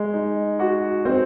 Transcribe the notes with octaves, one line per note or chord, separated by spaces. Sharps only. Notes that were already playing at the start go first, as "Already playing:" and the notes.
Already playing: G#3
D#4
F#4
C4